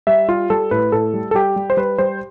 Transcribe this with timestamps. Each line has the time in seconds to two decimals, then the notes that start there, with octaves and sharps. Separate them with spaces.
0.07 G3 E5
0.29 G3 F4
0.50 G3 A4
0.71 A2 B4
0.92 A2 A4
1.14 G3
1.31 A4
1.35 G3 G4
1.56 G3
1.70 C5
1.77 G3 B4
1.98 G3 C5